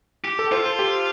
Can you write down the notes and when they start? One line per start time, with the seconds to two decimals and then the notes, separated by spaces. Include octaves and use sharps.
0.24 G4
0.39 A4
0.52 F4 C5
0.66 A4
0.79 G4